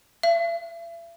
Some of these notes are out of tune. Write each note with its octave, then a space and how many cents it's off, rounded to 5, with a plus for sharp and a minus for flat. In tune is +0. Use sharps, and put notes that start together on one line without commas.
E5 +40